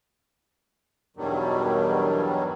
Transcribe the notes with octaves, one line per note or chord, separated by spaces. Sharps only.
E2 G2 B2 D#3 F#3 G3